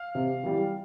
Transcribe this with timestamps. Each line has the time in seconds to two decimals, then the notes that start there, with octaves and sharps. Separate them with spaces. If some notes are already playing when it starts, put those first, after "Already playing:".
Already playing: F5
0.15 C3
0.43 E3 G3